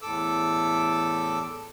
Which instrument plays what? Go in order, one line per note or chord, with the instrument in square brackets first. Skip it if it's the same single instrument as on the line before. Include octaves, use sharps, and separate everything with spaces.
[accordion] E2 A2 A4 D6 E6